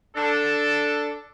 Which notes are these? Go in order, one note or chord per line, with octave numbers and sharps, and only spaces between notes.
D4 A4